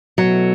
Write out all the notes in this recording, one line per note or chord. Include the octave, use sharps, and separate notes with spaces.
B2 F#3 A3 E4